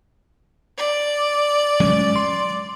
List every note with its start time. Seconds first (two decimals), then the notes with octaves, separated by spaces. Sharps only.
0.78 D5
1.80 F#3 G#3 C#4
2.16 C6